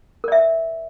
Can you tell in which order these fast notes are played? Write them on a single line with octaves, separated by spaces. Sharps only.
A#4 D5 E5